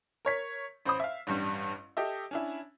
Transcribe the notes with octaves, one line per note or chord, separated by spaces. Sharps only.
A#4 C#5 B6
A1 C5 B5 D#6
E5 F5
A1 G2 G3
G4 A4 D#5 E5
C#4 D4 E4